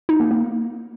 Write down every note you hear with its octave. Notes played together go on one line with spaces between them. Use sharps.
D#4
A#3
A#3